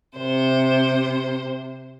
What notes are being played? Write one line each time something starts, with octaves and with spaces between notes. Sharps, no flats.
C3 C5